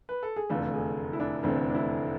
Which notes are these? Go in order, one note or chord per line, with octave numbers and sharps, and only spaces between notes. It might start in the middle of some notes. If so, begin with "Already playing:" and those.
B4
A4
G#4
F1 E2 D3 A3 F4
G#4
E4
D4
F1 E2 D3 A3 C4
D4
E4